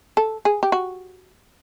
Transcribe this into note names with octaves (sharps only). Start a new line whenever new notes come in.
A4
G#4
G4
F#4